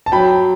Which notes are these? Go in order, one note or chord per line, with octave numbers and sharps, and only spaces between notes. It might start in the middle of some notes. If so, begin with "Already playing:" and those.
A5
F#3 G5 B5